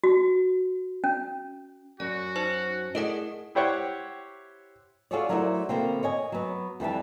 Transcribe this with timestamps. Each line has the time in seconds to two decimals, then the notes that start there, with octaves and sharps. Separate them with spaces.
0.04 F#4
1.04 C#4
2.00 F#2 F#4 D5
2.36 D#4 C5 A5
2.95 A3 E4 G#4 A#4 D5 D#5 F#5
3.55 E4 G4 C5 C#5 F#5
5.11 F4 F#4 G#4 A4 C#5 D5
5.29 F#3 A3 E4 A#4 C5 D5
5.69 B2 D3 A#3 C4
6.03 C#5 D#5 G#5
6.32 F#3 B3
6.80 F2 E3 G3 A5